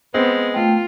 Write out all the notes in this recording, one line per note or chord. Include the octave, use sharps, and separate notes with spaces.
G#3 B3 C4
A3 F4 G5